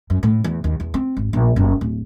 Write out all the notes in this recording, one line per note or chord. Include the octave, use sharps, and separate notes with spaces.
F#2
A2
E2
D#2
E2
C4
G#1
A#1
F#1
D1